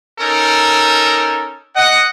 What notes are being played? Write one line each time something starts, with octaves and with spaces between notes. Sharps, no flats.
C#4 D#4 A4 A#4
D#5 F#5